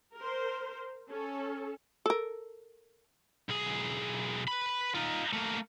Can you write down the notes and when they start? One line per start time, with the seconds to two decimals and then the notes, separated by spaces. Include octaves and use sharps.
0.16 A#4 C5
1.09 C#4 A4
2.06 A4 A#4
3.49 B1 G#4
4.48 B4 B5
4.95 D#4 F4
5.33 A3 A#3